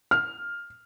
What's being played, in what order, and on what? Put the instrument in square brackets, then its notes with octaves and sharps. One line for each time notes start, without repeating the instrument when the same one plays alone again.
[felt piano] F6